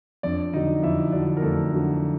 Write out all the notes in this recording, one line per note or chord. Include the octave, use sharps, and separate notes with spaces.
F2 D4 D5
D3 F#3 D#4 D#5
F2 E4 E5
D3 F#3 D4 D5
A#4
F2 A3 A4
D3 F#3